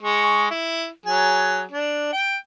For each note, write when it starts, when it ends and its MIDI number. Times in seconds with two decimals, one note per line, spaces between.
0.02 0.46 56
0.02 0.46 85
0.50 0.87 64
1.06 1.63 54
1.06 1.63 68
1.71 2.09 62
2.13 2.37 79